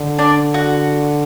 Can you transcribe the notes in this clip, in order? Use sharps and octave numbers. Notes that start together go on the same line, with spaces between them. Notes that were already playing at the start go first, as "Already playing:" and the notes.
Already playing: D3
D4 D5
F#4 F#5